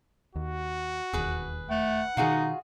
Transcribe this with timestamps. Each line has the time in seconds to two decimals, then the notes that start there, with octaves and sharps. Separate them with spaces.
0.36 D#2 F#4
1.13 E1 D#2 G#4 B4
1.71 A3 F#5
2.17 B2 D#3 D#4 F4 F#4 G#4